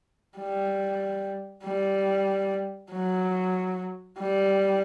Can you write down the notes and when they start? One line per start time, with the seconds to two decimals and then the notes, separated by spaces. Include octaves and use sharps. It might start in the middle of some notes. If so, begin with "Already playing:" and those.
0.38 G3
1.65 G3
2.92 F#3
4.19 G3